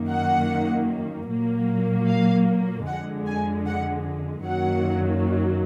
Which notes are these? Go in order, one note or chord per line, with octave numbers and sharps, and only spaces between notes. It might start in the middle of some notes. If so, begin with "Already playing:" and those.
Already playing: F#2 D#3 A#3
F#5
A#2 F#3 A#3
F5
F2 D3 G#3 F#5
G#5
F#5
F#2 D#3 F#3 A#3 F#5